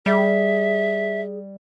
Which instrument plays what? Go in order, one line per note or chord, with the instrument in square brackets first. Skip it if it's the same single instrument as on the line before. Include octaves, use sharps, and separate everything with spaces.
[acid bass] G3 [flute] G#4 [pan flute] E5